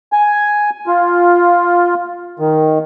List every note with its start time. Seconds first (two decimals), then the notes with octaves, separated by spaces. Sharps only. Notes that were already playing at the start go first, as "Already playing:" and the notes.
0.13 G#5
0.87 F4
2.39 D#3